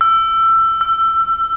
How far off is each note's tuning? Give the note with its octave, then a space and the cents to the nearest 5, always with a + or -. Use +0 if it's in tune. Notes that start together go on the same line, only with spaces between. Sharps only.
E6 +20
E6 +30